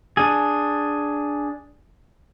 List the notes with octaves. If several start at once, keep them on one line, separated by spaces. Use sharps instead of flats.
D4 G#4